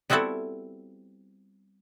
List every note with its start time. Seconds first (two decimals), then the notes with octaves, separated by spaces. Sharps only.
0.10 G3 B3 C4 E4 F#4 A4